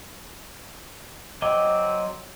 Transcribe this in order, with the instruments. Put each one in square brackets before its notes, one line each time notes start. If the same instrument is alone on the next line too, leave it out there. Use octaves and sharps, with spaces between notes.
[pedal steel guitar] F#3 D#5 D6 [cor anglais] C4